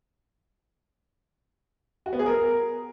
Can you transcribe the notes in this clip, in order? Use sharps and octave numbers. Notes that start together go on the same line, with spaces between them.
F#4
B3
G#4
A#4